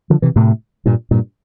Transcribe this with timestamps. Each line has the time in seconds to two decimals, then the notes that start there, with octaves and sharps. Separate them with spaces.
0.10 D3 F3
0.22 C3 E3
0.36 A2 C3
0.86 G2 A#2
1.11 G2 A#2